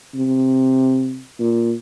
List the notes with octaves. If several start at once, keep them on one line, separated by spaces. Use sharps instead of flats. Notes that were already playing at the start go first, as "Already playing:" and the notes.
C3
A#2